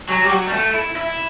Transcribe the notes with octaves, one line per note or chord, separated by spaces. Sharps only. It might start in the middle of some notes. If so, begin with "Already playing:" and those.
F#3
G3
F#3
G3
A3
E4
E4